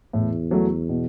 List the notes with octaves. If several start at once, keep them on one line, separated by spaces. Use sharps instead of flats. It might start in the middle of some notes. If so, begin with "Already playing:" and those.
E2 A2
F#3 A3
B2